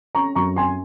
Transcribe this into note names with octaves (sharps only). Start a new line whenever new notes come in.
C#4 A#5 C#6
F#2 A#5 C#6
C#4 G#5 C6